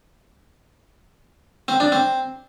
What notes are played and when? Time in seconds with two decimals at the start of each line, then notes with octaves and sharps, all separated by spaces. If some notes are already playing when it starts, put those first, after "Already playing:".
1.68 C4
1.80 D4
1.92 C4